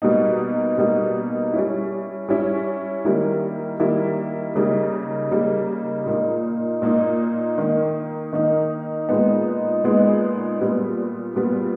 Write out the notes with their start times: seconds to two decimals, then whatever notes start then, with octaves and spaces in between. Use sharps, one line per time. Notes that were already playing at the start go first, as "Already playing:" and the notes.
0.02 B2 G3 A#3 D#4
0.78 B2 G3 A#3 D#4
1.53 G3 C#4 E4
2.29 G3 C#4 E4
3.05 D#3 G3 A#3 E4
3.80 D#3 G3 A#3 E4
4.55 C#3 G3 A#3 D#4
5.31 C#3 G3 A#3 D#4
6.06 A#2 A#3 D#4
6.82 A#2 A#3 D#4
7.58 D#3 A#3 D#4
8.33 D#3 A#3 D#4
9.09 A#2 G#3 B3 D#4
9.84 A#2 G#3 B3 D#4
10.60 A#2 G3 B3
11.36 A#2 G3 B3